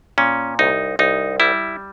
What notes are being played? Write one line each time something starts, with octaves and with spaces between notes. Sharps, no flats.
A#2 C#4
C2 D#4
C2 D#4
G3 E4